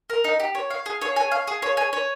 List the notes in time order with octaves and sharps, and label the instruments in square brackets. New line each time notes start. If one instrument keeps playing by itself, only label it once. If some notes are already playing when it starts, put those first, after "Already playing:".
[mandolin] A#4
D#4
G4
C#5
F5
G#4
C#5
G#5
F5
G#4
C#5
G#5
C#5